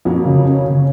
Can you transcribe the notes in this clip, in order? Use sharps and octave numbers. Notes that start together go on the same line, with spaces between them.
F2 F#3 A#3
C#3
C#4
C#3